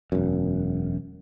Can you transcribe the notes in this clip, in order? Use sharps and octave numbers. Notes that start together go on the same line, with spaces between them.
E1 F#2